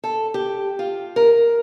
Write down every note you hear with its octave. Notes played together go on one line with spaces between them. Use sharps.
A4
G4
F4
A#4